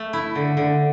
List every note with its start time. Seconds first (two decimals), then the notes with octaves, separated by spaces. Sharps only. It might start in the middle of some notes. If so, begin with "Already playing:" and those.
Already playing: A3
0.13 E4
0.35 D3
0.57 D3